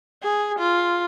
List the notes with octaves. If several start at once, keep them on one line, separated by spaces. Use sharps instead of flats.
G#4
F4